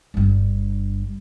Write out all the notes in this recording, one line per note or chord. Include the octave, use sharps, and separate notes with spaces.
G1 G2